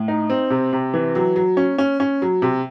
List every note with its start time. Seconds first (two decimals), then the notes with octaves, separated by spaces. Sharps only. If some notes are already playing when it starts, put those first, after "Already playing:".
Already playing: A2
0.08 D#4
0.30 C4
0.50 C3
0.73 C3
0.94 E3
1.15 F#3
1.36 F#3
1.57 C#4
1.78 C#4
2.00 C#4
2.22 F#3
2.42 C3